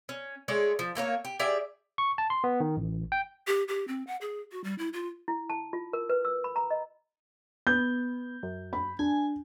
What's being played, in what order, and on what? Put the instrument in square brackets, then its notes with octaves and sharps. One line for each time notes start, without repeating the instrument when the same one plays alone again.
[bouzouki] C#4
G#3 A3 C#5 D5
F3
A3 A#3 B4 C#5
G4
G4 G#4 D5 E5
[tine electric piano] C#6
A5
C6
B3
D#3
A1
G5
[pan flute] G4
G4
C4
F#5
G#4
F#4
G3
E4
F4
[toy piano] E4
A5
F4
A#4
B4
E6
B5
A#5
D#5
[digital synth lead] B3 [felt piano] G6
[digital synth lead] F#2
[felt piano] B5
[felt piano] D4 [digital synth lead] G#5